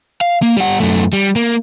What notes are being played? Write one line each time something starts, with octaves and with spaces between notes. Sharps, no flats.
F5
A#3
G3 F#5
F#2 A3
G3
A#3